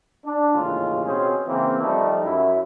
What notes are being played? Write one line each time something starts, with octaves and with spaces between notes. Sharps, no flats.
D4
A1 D#2 G#2 C#3 G#3 F4
B2 C4 C#4 G#4 C5
C#3 E3 A#3 C4
D#3 F3 G3 A3 D#4
F#2 E4